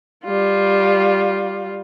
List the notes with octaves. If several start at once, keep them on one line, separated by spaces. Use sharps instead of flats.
G3 F4